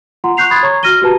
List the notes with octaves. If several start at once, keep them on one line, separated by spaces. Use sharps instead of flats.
F4 F#5 A#5 C6
C#6 F#6 G6 C7 F7
B5 C6 D#6 G#6 A6
C#5 A#5 C#6 G#6
F#4 F6 A#6 D#7 G7
F#4 G4 B4 A5 A#5